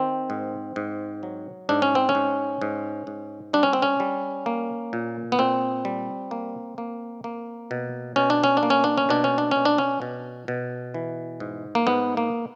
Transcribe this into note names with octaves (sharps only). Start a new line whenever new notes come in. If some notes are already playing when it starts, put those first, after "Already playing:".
Already playing: D#3 C4
G#2
G#2
F#3
G#2 D4
C#4
C4
C#4
G#2
G#2
G#2
G3 D4
C#4
C4
C#4
G3
A#3
A#2
B3
A#2 C4
G3
A#3
A#3
A#3
B2
B2 C#4
D4
C#4
D4
A#3
C#4
D4
C#4
B2 D4
C#4
D4
B2 C#4
D4
C#4
B2
B2
E3
G#2
A#3
G#2 B3
A#3